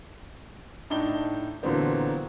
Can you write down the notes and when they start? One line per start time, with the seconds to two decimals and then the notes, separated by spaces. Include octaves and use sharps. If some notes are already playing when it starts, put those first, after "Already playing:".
0.90 A2 D4 D#4 G7
1.63 A#2 D3 E3 F#3 B3 C4